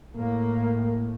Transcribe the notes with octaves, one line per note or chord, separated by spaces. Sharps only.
A2 A#3